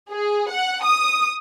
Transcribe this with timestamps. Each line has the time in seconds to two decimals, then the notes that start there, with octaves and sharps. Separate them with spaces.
0.11 G#4
0.51 F#5
0.84 D#6